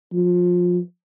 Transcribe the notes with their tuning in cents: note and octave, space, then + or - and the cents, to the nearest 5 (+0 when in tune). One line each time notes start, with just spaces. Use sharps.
F3 +25